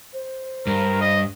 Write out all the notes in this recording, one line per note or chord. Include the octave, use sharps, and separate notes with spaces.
C5
G2 A#4
D#5